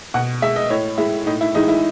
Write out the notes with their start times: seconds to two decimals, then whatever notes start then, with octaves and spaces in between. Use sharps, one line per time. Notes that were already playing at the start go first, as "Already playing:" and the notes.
0.14 B2 F#5
0.42 G#3 E5
0.56 D#5
0.70 A2 C#5
0.98 G#3 E4
1.26 A2 D#4
1.41 E4
1.55 E3 G#3 D#4
1.68 E4